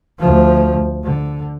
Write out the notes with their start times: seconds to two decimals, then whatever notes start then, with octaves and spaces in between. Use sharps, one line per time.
0.19 D2 F3
1.04 D3